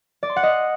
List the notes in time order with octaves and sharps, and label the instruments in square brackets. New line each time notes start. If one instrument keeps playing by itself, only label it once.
[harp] D5
C6
F#5
D#5